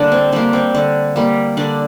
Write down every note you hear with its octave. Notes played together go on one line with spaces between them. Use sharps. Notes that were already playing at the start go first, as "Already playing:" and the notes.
Already playing: D3 G3 A#3 D4
C4
G3 A#3 D4
C4
D3
G3 A#3
D3 D4